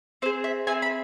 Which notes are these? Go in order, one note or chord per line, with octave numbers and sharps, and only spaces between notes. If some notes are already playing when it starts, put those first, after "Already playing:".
C4 G#4 C5
E5
C4 E4 G#4 G#5
B5